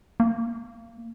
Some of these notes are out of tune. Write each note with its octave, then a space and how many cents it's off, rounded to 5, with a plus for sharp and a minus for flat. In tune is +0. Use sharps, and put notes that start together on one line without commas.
A#3 -25